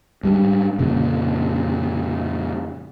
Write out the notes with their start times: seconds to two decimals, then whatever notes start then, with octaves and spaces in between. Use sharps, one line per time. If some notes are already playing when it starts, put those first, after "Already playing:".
0.23 G#2 G3
0.79 F2 A#2 C#3